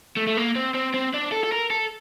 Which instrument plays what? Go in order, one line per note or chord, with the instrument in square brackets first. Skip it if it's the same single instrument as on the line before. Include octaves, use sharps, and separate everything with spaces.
[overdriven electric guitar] A3
A3
A#3
C4
C4
C4
D4
A4
A4
A#4
A4